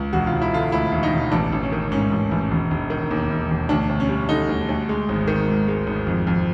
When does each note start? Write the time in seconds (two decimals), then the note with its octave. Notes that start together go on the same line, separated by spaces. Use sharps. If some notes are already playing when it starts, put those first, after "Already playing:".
Already playing: C#2
0.13 E1 F#4
0.27 F4
0.32 E1
0.42 E4
0.53 D3 F4
0.72 D2 E4
0.92 E1
1.03 D#4
1.13 E1
1.32 A1 D4
1.52 A1
1.62 C#4
1.72 D#3
1.92 G#2 C#4
2.12 A1
2.31 A1
2.51 E1
2.71 E1
2.90 D#3
3.11 D#2
3.30 E1
3.50 E1
3.69 D2 D4
3.89 D2
4.00 C#4
4.09 G3
4.29 D3 D#4
4.49 D2
4.69 D2
4.89 G#3
5.09 G#1
5.27 D#3
5.48 G#2
5.68 G#3
5.87 G#1
6.07 F2
6.27 F2